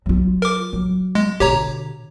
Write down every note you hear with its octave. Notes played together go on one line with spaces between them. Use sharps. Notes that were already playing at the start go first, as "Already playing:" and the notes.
F#3 F4
A#4 D6
F#3
G#3
B2 D3 G4 C#5 A#5